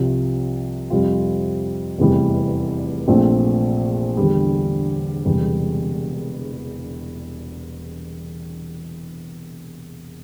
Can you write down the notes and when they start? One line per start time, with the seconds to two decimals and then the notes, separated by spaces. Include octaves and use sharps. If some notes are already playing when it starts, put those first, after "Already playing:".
Already playing: C2 C3 F3
0.90 F2 C3 G3 C4 F4
1.98 F1 E2 C3 E3 G3
3.08 A#1 A#2 F3 A3 C4
4.17 E2 D3 G3
5.25 E1 E2 C3 G3